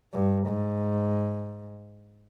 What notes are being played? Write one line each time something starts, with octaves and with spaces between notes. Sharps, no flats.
G2
G#2